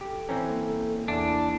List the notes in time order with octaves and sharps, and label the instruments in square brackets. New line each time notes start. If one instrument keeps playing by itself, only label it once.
[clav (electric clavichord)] G4 [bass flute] A4
[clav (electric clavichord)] E3 C4 C#4 [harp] A#5
[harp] A#3
[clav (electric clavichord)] E2 [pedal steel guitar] D4 [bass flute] E4